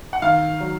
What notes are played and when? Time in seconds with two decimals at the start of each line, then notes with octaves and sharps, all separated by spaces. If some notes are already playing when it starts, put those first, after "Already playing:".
0.13 F#5
0.22 D#3 F5
0.60 F#3